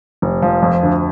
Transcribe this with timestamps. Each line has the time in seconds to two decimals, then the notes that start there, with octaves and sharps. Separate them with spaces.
0.22 F1
0.42 F3
0.63 F2
0.83 D2